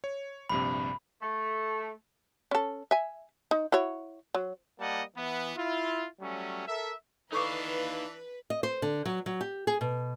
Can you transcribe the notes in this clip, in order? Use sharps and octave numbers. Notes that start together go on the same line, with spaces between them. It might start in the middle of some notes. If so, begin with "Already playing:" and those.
C#5
A#1 G2 C3 B5
A3
C#4 A4
E5 G#5
D#4
E4 F#4 C#5
F#3
G3 A#3 D#5 F#5 A5
E3 B3
E4 F4
F#3 G3 A3 C#4
A4 A#4 E5
E3 D4 D#4 A4 B4 F5 C#6 D6
D#5
C5
D3
F#3
F#3
G4
G#4
B2